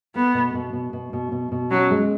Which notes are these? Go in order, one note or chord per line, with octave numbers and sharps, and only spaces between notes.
A3 B3
B2
B2
B2
B2
B2
B2
B2
F#3 C#4
G#3